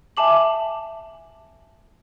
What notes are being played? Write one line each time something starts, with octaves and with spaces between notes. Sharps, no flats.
E5 G#5 A5 D6 F#7